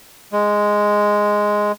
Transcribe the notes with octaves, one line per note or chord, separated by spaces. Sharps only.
G#3